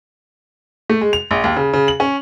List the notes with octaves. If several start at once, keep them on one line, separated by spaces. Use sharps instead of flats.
A3
G#3
F7
A#1
D#2
C#3
C#3
F#7
C#4